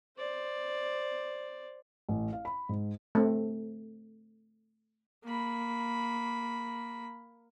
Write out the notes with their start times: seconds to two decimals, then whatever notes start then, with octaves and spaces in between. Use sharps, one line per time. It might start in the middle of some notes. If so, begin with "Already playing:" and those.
0.17 C5 D5
2.09 A1
2.33 F5
2.45 B5
2.69 G#2
3.15 A3 C4
5.25 A#3 B5